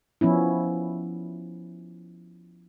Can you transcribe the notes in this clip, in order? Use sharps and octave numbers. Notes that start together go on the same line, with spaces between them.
F3 B3 C#4 E4